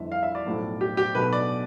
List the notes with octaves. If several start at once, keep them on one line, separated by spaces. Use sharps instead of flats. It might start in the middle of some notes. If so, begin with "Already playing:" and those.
Already playing: G1 F2 E3 E5
F5
E5
D5
B1 A2 F3 A3
G4
G4
B1 B2 A3 B4
D5